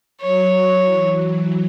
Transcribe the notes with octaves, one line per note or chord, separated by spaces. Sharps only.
F#3 C#5
E3